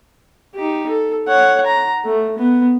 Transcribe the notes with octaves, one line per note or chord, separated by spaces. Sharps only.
D#4 G4
A4
C#5 F#5
A#5
A3
B3